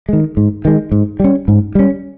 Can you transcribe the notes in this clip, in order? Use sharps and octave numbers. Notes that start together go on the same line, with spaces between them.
D#3 G#3
G#2
D#3 G#3
G#2
G3 C#4
G#2
G3 C#4